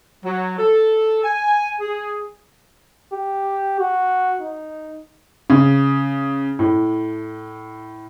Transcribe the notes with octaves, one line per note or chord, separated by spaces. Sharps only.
F#3
A4
G#5
G#4
G4
F#4
D#4
C#3
A2